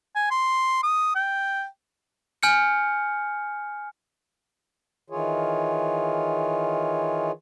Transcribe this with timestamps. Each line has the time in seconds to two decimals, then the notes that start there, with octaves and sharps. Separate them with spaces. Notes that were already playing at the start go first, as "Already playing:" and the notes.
0.16 G#5
0.31 C6
0.83 D#6
1.15 G5
2.43 G#5 F6 G6 C#7
5.10 D#3 E3 F4 G#4 C#5